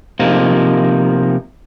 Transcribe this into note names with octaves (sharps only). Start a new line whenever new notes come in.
C3 F3 A#3 D#4